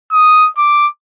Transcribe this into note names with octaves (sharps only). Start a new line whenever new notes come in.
D#6
D6